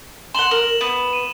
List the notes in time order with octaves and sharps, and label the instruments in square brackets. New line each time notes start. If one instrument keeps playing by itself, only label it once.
[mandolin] F#5 C6 [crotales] E7 F#7 G7
[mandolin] A#4
B3
[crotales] D#7